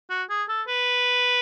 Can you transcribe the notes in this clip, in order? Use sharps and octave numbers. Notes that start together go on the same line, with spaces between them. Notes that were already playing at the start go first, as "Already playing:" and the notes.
F#4
G#4
A4
B4